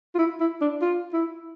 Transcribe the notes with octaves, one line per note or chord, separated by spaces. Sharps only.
F4
E4
E4
D4
F4
E4